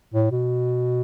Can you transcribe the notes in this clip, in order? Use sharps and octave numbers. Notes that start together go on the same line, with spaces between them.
A2
B2